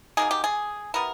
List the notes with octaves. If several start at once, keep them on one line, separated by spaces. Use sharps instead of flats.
F#3 A#3 D#4 G#4
G4
G#4
G3 B3 E4 A#4